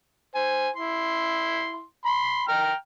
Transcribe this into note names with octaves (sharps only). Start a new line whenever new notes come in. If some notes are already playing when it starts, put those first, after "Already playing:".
C5 G#5
E4 C6
B5 C6
G5 A#5 F6